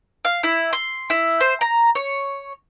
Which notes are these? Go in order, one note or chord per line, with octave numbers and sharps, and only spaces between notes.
F5
E4
C6
E4
C5
A#5
C#5